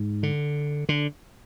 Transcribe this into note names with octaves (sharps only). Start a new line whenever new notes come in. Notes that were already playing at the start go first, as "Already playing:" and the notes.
Already playing: G#2
D3
D3